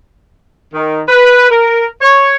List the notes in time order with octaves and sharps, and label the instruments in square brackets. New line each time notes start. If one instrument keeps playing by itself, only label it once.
[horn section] D#3
B4
A#4
C#5